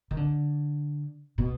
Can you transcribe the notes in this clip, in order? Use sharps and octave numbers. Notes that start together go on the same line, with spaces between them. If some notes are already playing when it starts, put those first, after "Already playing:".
D#3
D3
B2